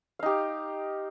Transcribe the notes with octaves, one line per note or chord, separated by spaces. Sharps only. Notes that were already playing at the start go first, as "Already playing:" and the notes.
D#4 G4 F5